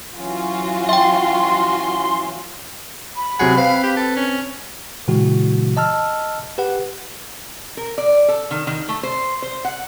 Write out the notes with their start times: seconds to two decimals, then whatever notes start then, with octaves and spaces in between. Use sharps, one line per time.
0.15 E3 F#3 C#4 F4 F#4
0.89 E5 G5 C6
3.16 B5
3.39 C3 F#3 G#4 F#5
3.57 C4 B4 F5
3.83 G4
3.96 A4
4.16 C#4
5.08 A#2 C#3 E3 G#3 F#4
5.77 D#5 A5 E6 F6
6.58 G4 B4 F#5
7.77 A#4
7.98 D5
8.28 A4
8.51 D#3
8.67 D#3
8.89 A3
9.03 C5
9.42 C5
9.65 F#5